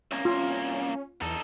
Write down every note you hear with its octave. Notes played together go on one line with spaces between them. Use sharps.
C2 A#3 C#4
F4
E2 D#4 A4